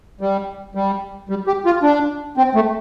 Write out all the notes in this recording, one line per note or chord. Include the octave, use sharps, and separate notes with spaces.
G3
G3
G3
G4
F4
D4
C4
A3